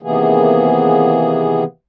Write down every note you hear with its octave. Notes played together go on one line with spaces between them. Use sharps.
C3 D#3 E3 A#3 B3 G#4